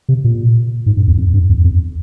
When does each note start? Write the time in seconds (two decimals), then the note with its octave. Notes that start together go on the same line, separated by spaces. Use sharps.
0.09 C3
0.24 A#2
0.86 G#2
0.97 G2
1.07 E2
1.18 F2
1.34 G2
1.49 E2
1.64 F2